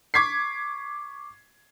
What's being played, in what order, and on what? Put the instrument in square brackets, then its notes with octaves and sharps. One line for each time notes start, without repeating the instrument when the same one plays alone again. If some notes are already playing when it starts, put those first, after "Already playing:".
[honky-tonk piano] C#6 D6 G#6 B6 C7